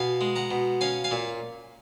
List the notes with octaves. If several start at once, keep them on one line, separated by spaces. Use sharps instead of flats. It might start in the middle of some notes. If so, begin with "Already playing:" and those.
Already playing: B2 F5 G#5
G#3
F#5 A#5
B2
C#4 F5 G#5
F5 G#5
A#2